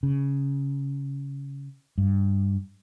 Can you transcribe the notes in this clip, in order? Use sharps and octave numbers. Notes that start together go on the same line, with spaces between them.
C#3
G2